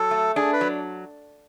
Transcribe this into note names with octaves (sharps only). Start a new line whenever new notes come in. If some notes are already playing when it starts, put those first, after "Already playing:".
Already playing: F#3 A4
A3
D4 G#4
B4
F#3